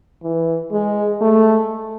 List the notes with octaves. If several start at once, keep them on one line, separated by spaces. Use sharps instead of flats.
E3
G#3
A3